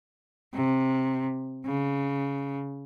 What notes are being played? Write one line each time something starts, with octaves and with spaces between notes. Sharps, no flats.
C3
C#3